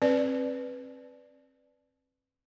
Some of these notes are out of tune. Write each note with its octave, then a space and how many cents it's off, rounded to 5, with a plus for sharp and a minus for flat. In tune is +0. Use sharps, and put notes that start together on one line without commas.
C4 +30 B4 +0 D5 +0